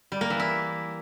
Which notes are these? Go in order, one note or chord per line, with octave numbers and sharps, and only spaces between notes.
G3
A#3
E3
E4